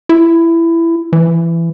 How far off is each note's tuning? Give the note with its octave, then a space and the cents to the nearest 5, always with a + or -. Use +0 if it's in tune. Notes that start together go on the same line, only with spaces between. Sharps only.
E4 +15
E3 +20